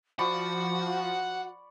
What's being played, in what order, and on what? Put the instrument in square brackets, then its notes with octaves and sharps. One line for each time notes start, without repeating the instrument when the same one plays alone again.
[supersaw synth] F3 [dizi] F#4 [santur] D5 B5 C#6 [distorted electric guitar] F#5